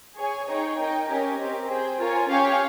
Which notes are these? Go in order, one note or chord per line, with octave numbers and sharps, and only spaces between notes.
G#4 C#5 G#5
D#4 G#4 C#5 G5
D#4 A#4 D#5 G5
C#4 G4 A#4 D#5 G#5
C4 G4 A#4
G#4 C5 G5
F4 A#4 C#5 G#5
C#4 G4 C#5 F5 G#5